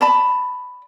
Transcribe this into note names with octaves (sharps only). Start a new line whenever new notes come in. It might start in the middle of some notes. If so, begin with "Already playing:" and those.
D5 A5 B5